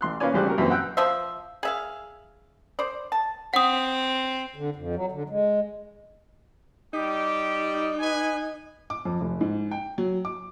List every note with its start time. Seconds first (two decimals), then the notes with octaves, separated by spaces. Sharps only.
0.01 A1 C6 F#6
0.20 A#3 C#4 F4 B4 D5 G#5
0.34 A1 C#3 G3 C5 D5 F#6
0.46 F#4 G4 A#4
0.58 F#2 A#2 E3 C4
0.70 F#5 G5 E6 F#6
0.97 F3 C5 E5
1.63 G#4 E5 F5
2.79 C5 D5
3.12 A5
3.54 C4 F#5 D#6
4.56 D3
4.76 F2
4.95 F#3
5.12 D3
5.30 G#3
6.93 G3 D#4 G4
7.99 B4 G#5
8.90 D6
9.05 F2
9.21 F1
9.41 G#2
9.71 G5
9.98 F#3
10.25 D6